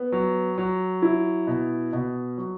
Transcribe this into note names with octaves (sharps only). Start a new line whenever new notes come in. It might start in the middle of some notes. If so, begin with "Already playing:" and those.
Already playing: B3
F#3
F#3
E4
B2
B2
F#3